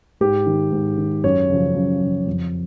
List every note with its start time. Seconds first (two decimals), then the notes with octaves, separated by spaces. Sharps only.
0.21 G#2 G4
0.46 D#3
0.72 G#2
0.98 D#3
1.24 F#2 C#5
1.50 C#3 F3
1.75 F#2
2.01 C#3 F3
2.27 F2